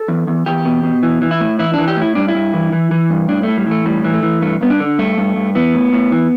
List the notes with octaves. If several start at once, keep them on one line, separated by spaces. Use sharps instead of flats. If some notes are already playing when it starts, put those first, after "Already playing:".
Already playing: A4
E2
E2
E2 G4
B2
B2
E3
E3
E4
A2
E3 E4
E3 D4
G4
A2 E4
G2 D4
E4
G2
E3
E3
E3
G2
A2 D4
A2 A3
G3
E3 A3
A2 G3
E3
A3
E3
G2 A3
G2 B3
D4
D3
G2 A3
G2
G2
E3 B3
A2
A2
E3